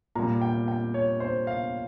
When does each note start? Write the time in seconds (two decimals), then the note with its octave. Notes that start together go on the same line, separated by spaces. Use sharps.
0.15 A#2 G3 A#5
0.41 G5
0.68 G5
0.94 C#5
1.20 C5
1.47 F5